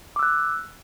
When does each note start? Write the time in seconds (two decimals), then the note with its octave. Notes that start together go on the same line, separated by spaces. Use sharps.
0.16 D6
0.19 E6
0.23 F#6